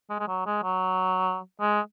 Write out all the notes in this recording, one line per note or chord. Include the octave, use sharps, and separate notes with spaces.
G#3
G#3
F#3
G#3
F#3
G#3